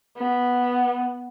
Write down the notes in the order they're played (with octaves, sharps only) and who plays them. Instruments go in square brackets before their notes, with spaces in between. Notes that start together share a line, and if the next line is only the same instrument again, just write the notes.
[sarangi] B3